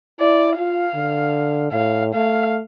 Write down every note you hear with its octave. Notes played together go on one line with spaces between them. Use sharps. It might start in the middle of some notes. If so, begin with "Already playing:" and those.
E4 D5
F4 F5
D3
A2 F5
A3 F5